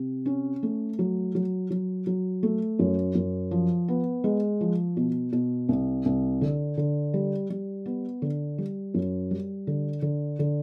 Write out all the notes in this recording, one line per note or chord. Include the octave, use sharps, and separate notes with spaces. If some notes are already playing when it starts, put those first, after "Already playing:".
Already playing: C3
C#4
A3
F#3
F#3
F#3
F#3
A3
F#2
F#2
F3
B3
G#3
F3
B2
B2
C2
C2
D3
D3
G3
G3
B3
D3
G3
F#2
G3
D3
D3
D3